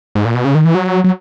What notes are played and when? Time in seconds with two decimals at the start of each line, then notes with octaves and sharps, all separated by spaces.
0.15 G#2
0.25 A#2
0.35 B2
0.45 C#3
0.55 D#3
0.65 E3
0.75 F#3
1.04 F#3